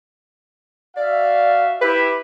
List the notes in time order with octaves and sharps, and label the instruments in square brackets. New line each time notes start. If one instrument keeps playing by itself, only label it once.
[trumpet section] F#4 E5 F5 [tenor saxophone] D5
[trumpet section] E4 G4 [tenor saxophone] B4